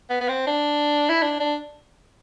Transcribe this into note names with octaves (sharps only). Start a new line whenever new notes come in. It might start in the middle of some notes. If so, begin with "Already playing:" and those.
B3
B3
C4
D4
E4
D4
D4